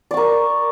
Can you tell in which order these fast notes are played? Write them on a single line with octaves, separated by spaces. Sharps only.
D5 C#6 A#4